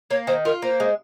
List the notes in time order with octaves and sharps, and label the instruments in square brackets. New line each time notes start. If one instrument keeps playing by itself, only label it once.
[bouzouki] A#3 [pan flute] C#5
[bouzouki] D#3 [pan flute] C5
[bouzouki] F4 [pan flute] A#4
[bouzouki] A#3 [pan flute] C5
[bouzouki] G#3